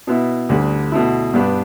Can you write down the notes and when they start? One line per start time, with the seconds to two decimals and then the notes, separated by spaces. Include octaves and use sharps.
0.07 B2 B3 E4
0.49 D2 D3 G3
0.92 B2 A3 E4
1.33 G2 G3 B3 D4